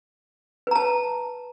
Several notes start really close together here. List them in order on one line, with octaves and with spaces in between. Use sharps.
B4 A#5 A5